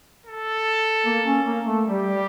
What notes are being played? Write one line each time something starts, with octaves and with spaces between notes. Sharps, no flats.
A4
A#3
C#4
A#3
A3
G3 G4
G3